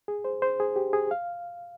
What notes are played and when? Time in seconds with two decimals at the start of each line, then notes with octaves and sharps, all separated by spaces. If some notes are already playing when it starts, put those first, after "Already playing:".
0.08 G#4
0.25 C5
0.42 C5
0.60 G#4
0.76 G4
0.93 G#4
1.11 F5